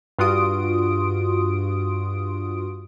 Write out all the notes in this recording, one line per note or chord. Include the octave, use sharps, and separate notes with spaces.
G2 F4 F#4 C6 D#6 D7